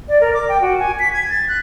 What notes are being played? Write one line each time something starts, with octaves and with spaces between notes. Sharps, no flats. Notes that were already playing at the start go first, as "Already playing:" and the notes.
D5
A#4
D6
G5
F#4
G#5
B6
G#6
A6
F#6